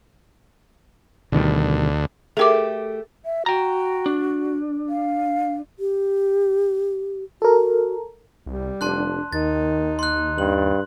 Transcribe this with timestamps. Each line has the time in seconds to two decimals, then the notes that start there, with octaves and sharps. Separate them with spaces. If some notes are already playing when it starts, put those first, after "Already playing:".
1.32 D2 B2 D#3 G3
2.37 A3 G4 G#4 A#4 D6
3.25 E5
3.46 F#4 G5 A#5
4.06 D4
4.89 F5
5.79 G4
7.42 F#4 A4 A#4
8.46 C2 G3
8.81 F1 D4 A5 C6 F#6
9.33 D#2 D#3 D#4 A6
9.99 C6 F#6
10.38 G2 F#7